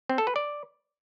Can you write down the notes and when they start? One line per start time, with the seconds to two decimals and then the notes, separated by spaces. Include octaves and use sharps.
0.09 C4
0.18 A4
0.27 B4
0.36 D5